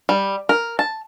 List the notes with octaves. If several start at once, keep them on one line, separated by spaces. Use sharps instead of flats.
G3
A#4
A5